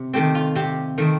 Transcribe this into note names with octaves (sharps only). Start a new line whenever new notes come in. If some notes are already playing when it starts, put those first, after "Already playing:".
Already playing: C3
D#3 A3 C4 G4
F4
C3 G4
D#3 A3 C4